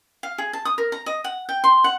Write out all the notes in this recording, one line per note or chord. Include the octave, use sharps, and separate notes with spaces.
F5
G#4
A5
D#6
A#4
A#5
D#5
F#5
G5
C6
F#5